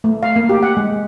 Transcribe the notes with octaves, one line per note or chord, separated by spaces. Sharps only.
A3
F5
A#3
G4
F#5
G#3